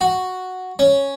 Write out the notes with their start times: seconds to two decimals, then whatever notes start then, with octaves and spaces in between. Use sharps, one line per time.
0.01 F#4
0.79 C#4